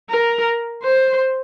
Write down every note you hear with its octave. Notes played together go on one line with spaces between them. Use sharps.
A#4
C5